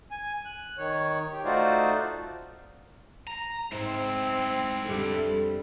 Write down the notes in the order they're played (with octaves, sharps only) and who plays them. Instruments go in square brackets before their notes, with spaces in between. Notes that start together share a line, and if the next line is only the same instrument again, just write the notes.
[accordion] G#5
F#6
D#3 C#5
G4
A3 D#4 F4 F#4 C5 D5
[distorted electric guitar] A#5
[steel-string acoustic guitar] G#2 [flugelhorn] C4 [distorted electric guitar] E4 C5
[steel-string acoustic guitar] F2 D3 G3 [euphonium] A4